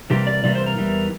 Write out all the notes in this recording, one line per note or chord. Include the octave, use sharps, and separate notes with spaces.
C3 E3 G3 A#3 G4
D5
C3 E3 G3 A#3 D5
C5
A#4
E2 E3 G3